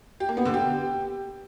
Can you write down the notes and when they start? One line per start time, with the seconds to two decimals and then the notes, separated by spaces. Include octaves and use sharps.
0.20 G4
0.29 A#3
0.37 B3
0.45 D3
0.54 G4